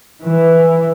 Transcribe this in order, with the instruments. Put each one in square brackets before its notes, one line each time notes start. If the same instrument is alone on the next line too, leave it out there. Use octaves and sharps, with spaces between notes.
[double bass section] E3